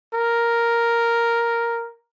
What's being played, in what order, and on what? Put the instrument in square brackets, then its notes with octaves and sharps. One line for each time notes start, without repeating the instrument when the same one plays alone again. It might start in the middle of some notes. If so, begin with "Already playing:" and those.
[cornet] A#4